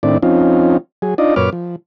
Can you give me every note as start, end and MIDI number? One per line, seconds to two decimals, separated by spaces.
0.03 0.18 45
0.03 0.18 51
0.03 0.18 60
0.03 0.18 62
0.03 0.18 64
0.03 0.18 74
0.23 0.77 53
0.23 0.77 60
0.23 0.77 61
0.23 0.77 63
0.23 0.77 65
1.02 1.14 54
1.02 1.14 68
1.18 1.35 62
1.18 1.35 63
1.18 1.35 65
1.18 1.35 74
1.18 1.35 75
1.36 1.50 42
1.36 1.50 46
1.36 1.50 71
1.36 1.50 73
1.36 1.50 86
1.36 1.50 89
1.52 1.76 53